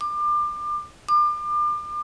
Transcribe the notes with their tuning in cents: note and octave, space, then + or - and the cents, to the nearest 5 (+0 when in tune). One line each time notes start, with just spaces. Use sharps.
D6 +30
D6 +35